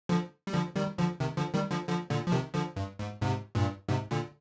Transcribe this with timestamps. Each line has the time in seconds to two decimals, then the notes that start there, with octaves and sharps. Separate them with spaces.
0.09 D3 F3
0.47 G3
0.53 D3 F3
0.76 D#3 G3
0.98 D3 F3
1.20 C3 D#3
1.37 D3 F3
1.54 D#3 G3
1.71 D3 F3
1.88 D3 F3
2.10 A#2 D3
2.27 F3
2.32 C3 D#3
2.54 D3 F3
2.76 G2
2.99 G#2
3.22 G#2 C3
3.55 G2 A#2
3.88 G#2 C3
4.11 A#2 D3